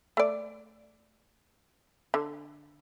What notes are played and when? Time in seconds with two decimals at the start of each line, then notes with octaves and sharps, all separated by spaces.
0.17 A3 D5
2.14 D3